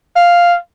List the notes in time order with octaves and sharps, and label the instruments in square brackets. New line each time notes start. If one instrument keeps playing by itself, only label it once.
[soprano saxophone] F5